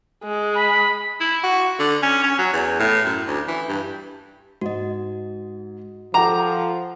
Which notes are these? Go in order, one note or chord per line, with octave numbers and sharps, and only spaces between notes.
G#3
B5
E4
F#4
D3
C#4
C#4
F#3
E2
A2
F#2
D2
E3
G2
G#2 F#4 D#5
F3 A4 F#5 G5 A#5 D6